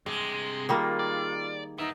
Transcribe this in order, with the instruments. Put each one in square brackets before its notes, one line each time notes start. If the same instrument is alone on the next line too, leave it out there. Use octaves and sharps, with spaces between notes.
[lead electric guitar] G2 C3 [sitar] G#3
[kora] D#3 G3 A#3 [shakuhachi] F4
[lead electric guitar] D5
[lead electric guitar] B3 E5 [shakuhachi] D#4